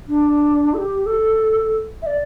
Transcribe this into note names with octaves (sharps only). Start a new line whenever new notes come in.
D4
A4
G4
A4
E5
D5